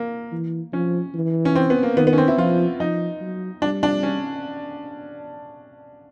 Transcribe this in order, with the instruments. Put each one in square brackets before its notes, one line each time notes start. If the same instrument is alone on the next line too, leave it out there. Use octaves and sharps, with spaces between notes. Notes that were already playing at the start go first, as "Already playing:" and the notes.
Already playing: [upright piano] A#3
[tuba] E3
[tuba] F3 [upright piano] C#4
[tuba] E3
[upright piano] C#4
C4
B3
A#3
[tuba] D#3 [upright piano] B3
[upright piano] B3
C#4
C4
E4
[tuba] F3 [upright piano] F4
[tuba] F3 [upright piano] D#4
[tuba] F#3
[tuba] G3 [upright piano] D4
[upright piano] D4
C#4